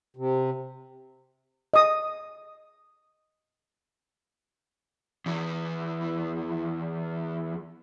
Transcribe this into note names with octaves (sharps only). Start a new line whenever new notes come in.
C3
D#5 D#6
E2 E3